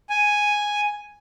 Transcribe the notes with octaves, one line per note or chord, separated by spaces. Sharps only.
G#5